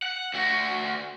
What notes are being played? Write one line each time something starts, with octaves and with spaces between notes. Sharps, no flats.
F#5
D2 F#4